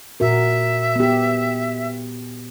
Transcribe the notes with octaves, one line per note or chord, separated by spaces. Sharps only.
A#2 F#4 A#4 E5
B3 G4